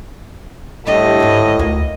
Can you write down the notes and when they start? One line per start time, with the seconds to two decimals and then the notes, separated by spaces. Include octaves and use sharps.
0.87 A2 G3 D4 G4 D#5
1.20 D2 G#2
1.59 D2 A#3